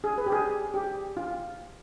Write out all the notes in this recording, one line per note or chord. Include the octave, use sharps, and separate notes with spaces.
G#4
B4
G4
G#4
G4
F4